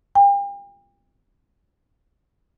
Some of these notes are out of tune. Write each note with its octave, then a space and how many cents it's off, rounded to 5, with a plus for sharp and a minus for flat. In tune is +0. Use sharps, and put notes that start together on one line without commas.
G5 +40